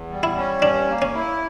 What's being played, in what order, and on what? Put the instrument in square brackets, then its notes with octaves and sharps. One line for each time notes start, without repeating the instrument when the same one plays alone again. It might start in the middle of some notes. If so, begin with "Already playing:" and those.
Already playing: [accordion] E2
G3
[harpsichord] E4
[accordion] C#4
[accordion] G2 [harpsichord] D4
[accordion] A#3
[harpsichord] C#4
[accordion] E4